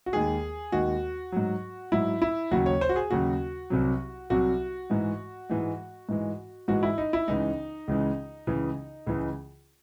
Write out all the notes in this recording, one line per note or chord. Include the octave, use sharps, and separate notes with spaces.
F#4
D#2 D#3 G#3 G#4
D#2 D#3 G#3 F#4
G#2 F#3
G#2 F#3 E4
E4
D#2 C#3 F#3 F#4
C#5
C5
F#4
G#4
D#2 C#3 F#3 F#4
C2 C3 F#3
C2 C3 F#3 F#4
G#2 E3 G#3
G#2 E3 G#3
G#2 E3 G#3
G#2 E3 G#3 F#4
E4
D#4
E4
C#2 C#3 E3 G#3 D#4
C#2 C#3 E3 G#3
C#2 C#3 E3 G#3
C#2 C#3 E3 G#3